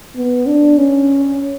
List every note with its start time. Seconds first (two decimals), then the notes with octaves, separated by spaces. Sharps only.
0.16 B3
0.47 D4
0.78 C#4